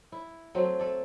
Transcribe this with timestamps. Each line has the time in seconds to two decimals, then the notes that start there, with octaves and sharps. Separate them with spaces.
0.12 E4
0.55 F#3 A3 C4
0.79 A3 A4 D5